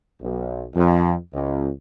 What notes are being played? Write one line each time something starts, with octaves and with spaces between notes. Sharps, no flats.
B1
F2
C#2